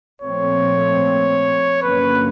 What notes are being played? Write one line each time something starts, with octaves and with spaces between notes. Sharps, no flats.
A#2 F3 A3 C4 C#5
G2 D3 F#3 A#3 C#4 B4